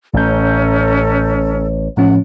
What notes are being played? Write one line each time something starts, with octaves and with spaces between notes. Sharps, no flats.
A1 A2 C#4 A4 A#5 G6
A2 F3 C#4 F#5